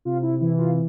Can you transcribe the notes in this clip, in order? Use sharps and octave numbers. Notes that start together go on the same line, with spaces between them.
C3 F4
E4
E3 E4
F4